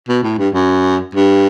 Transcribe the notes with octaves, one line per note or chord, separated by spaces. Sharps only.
B2
A2
G2
F#2
G2